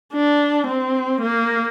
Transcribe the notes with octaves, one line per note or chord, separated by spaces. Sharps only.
D4
C4
A#3